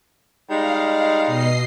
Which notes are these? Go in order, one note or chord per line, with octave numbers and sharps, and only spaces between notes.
G3 G#3 D#4 F5
F5
B2 D#5 C7